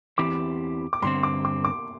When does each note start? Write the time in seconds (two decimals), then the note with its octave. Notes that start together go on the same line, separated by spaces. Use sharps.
0.18 E2 E3 C4 E4 G4 D6
0.93 D6
1.02 G2 D3 C4 C6
1.23 D6
1.45 D6
1.65 D6